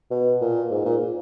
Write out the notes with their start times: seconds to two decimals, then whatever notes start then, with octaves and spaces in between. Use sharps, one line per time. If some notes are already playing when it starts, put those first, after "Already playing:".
0.11 B2
0.41 A#2
0.71 G#2
0.85 A#2